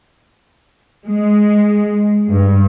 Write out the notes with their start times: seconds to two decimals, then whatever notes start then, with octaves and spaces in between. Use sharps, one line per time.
1.07 G#3
2.30 G2